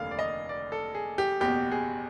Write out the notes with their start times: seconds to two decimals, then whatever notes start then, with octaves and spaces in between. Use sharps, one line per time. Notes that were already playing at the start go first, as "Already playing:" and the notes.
Already playing: F1 D#2 D3 A#3 F5
0.11 D5
0.19 D#5
0.49 D5
0.72 A4
0.95 G#4
1.18 G4
1.41 F#1 E2 B2 G4
1.71 G#4